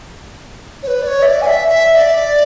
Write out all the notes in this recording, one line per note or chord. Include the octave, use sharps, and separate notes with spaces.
C#5
B4
D5
C#5
E5
D5
G#5
E5
E5
D5